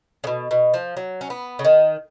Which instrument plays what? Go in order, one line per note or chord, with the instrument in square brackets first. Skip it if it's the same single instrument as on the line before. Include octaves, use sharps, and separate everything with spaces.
[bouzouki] C#3
B2
B2
F3
F#3
C#4
B3
C#3
D#3